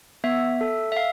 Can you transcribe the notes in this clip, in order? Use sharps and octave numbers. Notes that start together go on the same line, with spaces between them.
B3 E5
A4
E5
F5